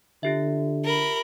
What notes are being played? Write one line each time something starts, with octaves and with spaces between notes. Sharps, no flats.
D3 F4 G4 E5
A#4 B5